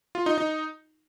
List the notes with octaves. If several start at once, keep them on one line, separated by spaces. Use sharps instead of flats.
F4
D#4
D#4